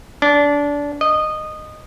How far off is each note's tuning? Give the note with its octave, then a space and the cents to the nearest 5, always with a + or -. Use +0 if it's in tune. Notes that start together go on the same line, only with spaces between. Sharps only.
D4 -20
D#5 -15